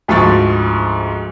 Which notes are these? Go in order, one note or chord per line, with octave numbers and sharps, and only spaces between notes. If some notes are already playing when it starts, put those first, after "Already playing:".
D2 G#2 F3 C#6 A6